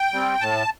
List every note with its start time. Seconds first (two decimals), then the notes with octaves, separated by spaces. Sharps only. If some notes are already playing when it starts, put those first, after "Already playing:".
Already playing: G5
0.13 G3 C4
0.41 A2 A5